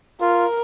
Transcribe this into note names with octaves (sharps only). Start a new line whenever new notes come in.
F4 A#4